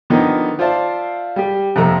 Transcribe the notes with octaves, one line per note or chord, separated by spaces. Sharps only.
D3 D#3 F3 B3 D#4
F4 C5 D5 E5 F5 A5
G3 G4
F2 C3 D#3 A#3 A4 A#5